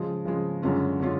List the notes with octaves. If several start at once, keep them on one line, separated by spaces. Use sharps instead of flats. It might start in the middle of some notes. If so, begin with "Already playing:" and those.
Already playing: C#3 F3 G#3
C#3 F3 G#3
F#2 D3 G#3 C#4 F4
D3 G#3 C#4 F4